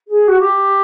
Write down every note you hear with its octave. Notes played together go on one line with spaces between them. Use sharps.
G#4
F#4
G4